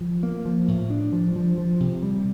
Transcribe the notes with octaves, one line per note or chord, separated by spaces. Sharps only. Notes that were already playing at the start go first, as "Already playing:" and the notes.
F3
A#3
F3
A2
D4
F3
F3
F3
C3
G3